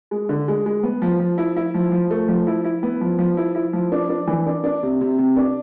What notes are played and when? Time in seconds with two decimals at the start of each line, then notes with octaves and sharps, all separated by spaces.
0.11 G#3
0.29 D3
0.48 G#3
0.66 G#3
0.83 B3
1.02 F3
1.19 F3
1.38 E4
1.56 E4
1.74 F3
1.92 F3
2.11 A3
2.28 F3
2.47 E4
2.64 E4
2.83 B3
3.01 F3
3.19 F3
3.37 E4
3.55 E4
3.73 F3
3.92 D4
4.09 D4
4.27 E3
4.46 D4
4.64 D4
4.83 C3
5.01 C3
5.18 C3
5.37 D4